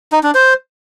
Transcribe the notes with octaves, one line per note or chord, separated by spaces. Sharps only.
D#4
D4
C5